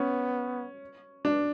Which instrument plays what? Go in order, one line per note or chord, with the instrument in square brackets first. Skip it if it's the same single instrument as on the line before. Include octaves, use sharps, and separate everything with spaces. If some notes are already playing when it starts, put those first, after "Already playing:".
Already playing: [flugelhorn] B3 [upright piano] C#4
[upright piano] D4